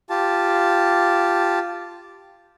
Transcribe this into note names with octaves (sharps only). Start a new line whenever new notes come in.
F4 G4 A5